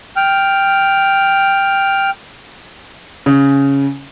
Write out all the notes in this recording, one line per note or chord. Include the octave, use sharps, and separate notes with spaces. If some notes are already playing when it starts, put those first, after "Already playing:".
G5 F6
C#3